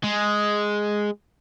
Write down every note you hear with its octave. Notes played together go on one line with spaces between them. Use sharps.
G#3